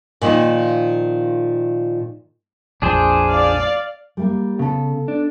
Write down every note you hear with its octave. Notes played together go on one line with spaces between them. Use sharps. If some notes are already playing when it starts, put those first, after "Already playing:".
A#2 D#3 F3
A#1 F2 F3 D4 G#4 C5
D5 F5
G3 A3 A#3
C#3 B3 A4
D4